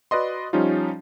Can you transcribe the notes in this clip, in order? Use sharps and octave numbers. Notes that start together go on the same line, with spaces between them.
F#4 B4 D5 D#5 C6
F3 G3 C#4 D#4 F4